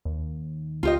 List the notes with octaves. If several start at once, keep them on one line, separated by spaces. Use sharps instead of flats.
D#2
C#2 F4 G4 D#5